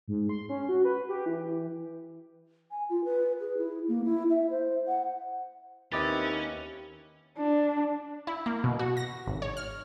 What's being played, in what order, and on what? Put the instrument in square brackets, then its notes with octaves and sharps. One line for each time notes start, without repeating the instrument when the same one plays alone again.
[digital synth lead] G#2
C6
C#4
F#4
B4
G4
E3
[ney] G#5
F4
B4
G#4
E4
A#3
E4
E5
C5
F#5
[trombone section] D#2 [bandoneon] C4 E4 B4 [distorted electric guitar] C#4 [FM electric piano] D#5 D6 A6
[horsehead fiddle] D4
[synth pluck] E4
A#3
B2
F#4
A#6
G#1
C#5
F6